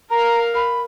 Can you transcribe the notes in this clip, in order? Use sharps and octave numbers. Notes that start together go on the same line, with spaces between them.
A#4 F5 A#5
B5